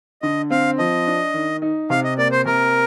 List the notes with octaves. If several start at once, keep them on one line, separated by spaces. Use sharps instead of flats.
D3 D#5
C4 F5
F3 D#5
D4
D#3
D#4
C3 F5
D#5
A#3 D5
C5
C3 A#4